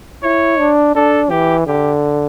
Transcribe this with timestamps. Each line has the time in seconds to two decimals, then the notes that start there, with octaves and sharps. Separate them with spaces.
0.23 E4 C#5
0.59 D4
0.95 D4 A4
1.31 E3 G4
1.66 D3 G4